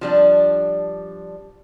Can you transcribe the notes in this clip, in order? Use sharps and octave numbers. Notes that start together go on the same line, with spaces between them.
F3 G3 D4